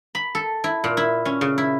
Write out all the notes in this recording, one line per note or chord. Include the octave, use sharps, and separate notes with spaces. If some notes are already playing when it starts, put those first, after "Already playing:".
B5
A4
E4
A#2
E4
C#4
C#3
E4